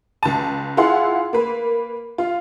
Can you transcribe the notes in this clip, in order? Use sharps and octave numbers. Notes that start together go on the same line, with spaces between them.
C#2 A5
E4 F4 G#4 F#5 C6
A#3 B4
F4